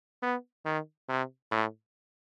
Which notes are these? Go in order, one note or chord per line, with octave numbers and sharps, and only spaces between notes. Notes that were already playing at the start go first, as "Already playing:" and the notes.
B3
D#3
C3
A2